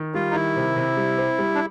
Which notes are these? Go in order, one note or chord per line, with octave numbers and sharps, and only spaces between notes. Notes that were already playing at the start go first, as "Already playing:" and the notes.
Already playing: D#3
G3 F4
D#4
D#3 E4
C3
C3
G3
C4
G3
D4